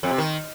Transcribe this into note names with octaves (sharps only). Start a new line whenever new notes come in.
F2
C3
D#3